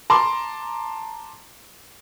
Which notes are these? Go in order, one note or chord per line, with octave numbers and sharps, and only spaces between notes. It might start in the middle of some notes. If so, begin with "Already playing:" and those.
A5 A#5 C6 D6